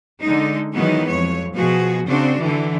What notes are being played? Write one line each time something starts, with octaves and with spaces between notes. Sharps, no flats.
D3 G#3 D#4
D#3 E3 F#3 G#3 B3 D#4
F2 C#5
B2 F3 F#4 G#4
C#3 C4 D4 F#4
D3 E3